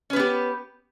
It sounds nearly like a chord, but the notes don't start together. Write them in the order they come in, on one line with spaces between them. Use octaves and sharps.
C#4 B4 B3 G4